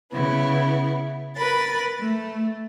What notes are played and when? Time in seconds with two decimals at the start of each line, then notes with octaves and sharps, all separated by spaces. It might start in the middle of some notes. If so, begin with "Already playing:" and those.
0.13 C#3 B3 E4
1.36 A#4 B4 B5 A6
1.99 A3